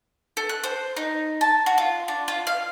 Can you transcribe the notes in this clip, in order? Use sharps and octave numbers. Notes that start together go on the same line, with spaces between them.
A4
F#6
C5
D#4
A5
F#4
F4
D4
F4
F5